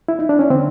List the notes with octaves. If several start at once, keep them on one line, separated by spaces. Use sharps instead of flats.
E4
D#4
D4
C#4
D3 C4